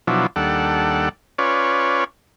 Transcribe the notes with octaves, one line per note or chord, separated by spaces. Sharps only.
B2 F3 F#3 D4 E4
D#2 G3 D4 A4 F#5
C#4 F4 B4 C#5 D5